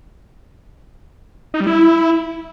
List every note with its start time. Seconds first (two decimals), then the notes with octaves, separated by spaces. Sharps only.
1.54 D#4
1.60 G3
1.67 E4